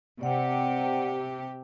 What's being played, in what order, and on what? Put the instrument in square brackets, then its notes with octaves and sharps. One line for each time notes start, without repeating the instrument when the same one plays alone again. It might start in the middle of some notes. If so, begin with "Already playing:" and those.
[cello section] C3 G4 [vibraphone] D5 F#5 G5